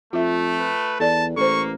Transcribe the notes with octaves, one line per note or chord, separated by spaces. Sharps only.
F2 A3 F4 E5
B4
E2 A4 D5 A5
A1 A#3 A4 C5 C#6